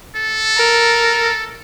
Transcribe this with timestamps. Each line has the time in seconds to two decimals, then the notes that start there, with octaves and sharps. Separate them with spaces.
0.16 A4
0.57 A#4